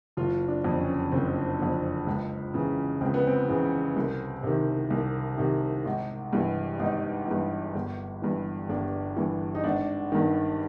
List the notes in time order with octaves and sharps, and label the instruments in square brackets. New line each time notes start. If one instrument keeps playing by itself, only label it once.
[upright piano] F#1 F4
D4
F2 D3
C#4
F#1 C4
F2 D3
C#2
C#3 E3
C#2 C4
B3
C4
C#3 E3
C2
C3 D#3
C2
C3 D#3
G#1
G2 E3
G#1 D#4
G2 E3
G1
G2 E3
G1 D4
G2 E3
D#4
G#1 D4
G2 D#3